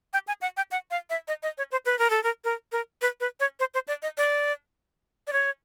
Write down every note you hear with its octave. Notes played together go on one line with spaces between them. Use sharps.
G5
G#5
F#5
G5
F#5
F5
E5
D#5
D#5
C#5
C5
B4
A#4
A4
A#4
A#4
A#4
B4
B4
C#5
C5
C5
D5
D#5
D5
D5
C#5